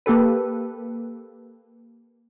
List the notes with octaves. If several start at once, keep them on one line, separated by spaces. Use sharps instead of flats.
A#3 G4 A4 B4